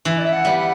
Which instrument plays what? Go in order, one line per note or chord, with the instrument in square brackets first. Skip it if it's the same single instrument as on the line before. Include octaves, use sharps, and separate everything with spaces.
[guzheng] E3 [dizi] E5
[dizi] D5
E5
F#5
[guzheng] G3 B3
[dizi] F#5